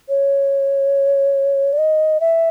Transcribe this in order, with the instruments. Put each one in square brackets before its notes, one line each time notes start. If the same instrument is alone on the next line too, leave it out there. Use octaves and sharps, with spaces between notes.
[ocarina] C#5
D5
D#5
E5